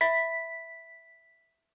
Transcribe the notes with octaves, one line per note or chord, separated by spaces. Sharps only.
E5 B5 A6 B6